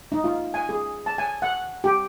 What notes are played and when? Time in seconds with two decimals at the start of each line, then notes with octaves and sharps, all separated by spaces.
0.12 D#4
0.24 F4
0.54 G#5
0.69 G#4
1.06 A5
1.18 G#5
1.42 F#5
1.84 G4